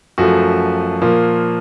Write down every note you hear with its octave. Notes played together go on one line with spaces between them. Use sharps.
F#2 F3 A3 F#4
A#2 F3 A#3